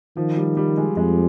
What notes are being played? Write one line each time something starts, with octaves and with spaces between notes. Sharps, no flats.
D#3 F3
G3
G3
G#3
F2 G#3